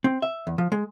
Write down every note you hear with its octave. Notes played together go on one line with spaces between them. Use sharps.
C4
E5
E2
F3
G#3